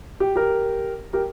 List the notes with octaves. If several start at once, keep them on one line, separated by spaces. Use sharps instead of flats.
G4
G4 A#4
G4 A#4